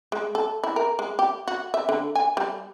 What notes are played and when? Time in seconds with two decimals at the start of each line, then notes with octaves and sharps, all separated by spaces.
0.12 G#3
0.35 A4
0.64 E4
0.76 A#4
0.99 G#3
1.19 G4
1.48 F#4
1.74 E5
1.89 D3
2.15 G#5
2.37 G3